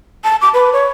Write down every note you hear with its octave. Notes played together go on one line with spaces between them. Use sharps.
A5
D6
B4
C#5